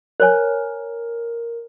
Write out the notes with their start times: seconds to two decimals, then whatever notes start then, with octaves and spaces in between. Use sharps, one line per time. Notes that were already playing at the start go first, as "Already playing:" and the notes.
0.20 A#4 C5 C#5 G#5